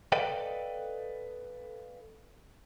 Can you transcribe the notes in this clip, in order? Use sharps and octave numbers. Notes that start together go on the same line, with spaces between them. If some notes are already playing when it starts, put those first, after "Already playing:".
A4 B4 D5 D#5 F5 G5